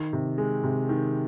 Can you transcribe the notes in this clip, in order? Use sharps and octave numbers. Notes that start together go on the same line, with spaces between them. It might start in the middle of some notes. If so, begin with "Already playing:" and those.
Already playing: D#3
C3
G#3
C3
D#3